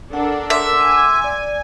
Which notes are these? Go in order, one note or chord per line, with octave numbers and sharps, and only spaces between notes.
D4 A4 A#4 F#5
E5 F#5 C6 D6
G#5
D5